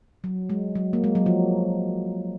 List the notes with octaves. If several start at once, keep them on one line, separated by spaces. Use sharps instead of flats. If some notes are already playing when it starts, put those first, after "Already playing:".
F#3
G#3
F#3
A#3
G#3
F#3
F3